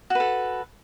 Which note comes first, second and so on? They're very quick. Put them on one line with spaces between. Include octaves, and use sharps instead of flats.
F#4 B4 A4